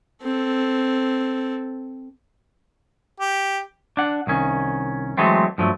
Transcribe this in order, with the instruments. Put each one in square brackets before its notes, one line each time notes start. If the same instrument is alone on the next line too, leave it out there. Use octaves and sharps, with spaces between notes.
[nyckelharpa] C4 A4
[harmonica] G4
[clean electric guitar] D4 F#5
C2 D#3 C#4
E3 F#3 G#3 A3 C4
G2 F3 F#3 A3